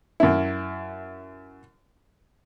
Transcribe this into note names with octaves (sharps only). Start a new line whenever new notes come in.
F#2 E4